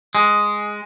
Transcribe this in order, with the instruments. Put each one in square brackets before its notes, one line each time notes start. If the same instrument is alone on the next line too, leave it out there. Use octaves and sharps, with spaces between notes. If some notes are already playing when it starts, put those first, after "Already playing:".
[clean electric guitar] G#3